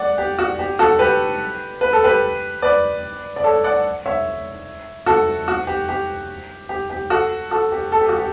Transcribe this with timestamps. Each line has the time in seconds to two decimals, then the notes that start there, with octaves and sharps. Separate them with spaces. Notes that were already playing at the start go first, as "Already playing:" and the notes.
Already playing: D5 F#5
0.18 G4
0.39 F#4
0.59 G4
0.79 F#4 A4
0.99 G4 B4
1.81 B4
1.93 A4
2.04 G4 B4
2.62 B4 D5
3.36 D5
3.44 A4 C#5
3.64 D5 F#5
4.06 C#5 E5
5.06 F#4 A4
5.48 F#4
5.67 G4
5.89 G4
6.69 G4
6.90 G4
7.10 F#4 A4
7.51 F#4 A4
7.72 G4
7.92 A4
8.01 G4
8.09 F#4
8.18 G4